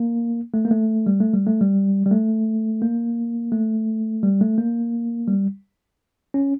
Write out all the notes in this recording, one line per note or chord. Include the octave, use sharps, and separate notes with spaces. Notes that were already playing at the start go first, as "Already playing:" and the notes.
Already playing: A#3
A3
A#3
A3
G3
A3
G3
A3
G3
G3
A3
A#3
A3
G3
A3
A#3
G3
C#4